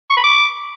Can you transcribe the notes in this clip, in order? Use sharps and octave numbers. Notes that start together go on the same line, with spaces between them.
C#6
B5
D6